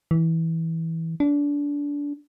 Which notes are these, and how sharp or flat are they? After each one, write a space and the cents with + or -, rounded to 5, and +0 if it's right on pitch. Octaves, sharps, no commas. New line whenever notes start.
E3 -15
D4 -25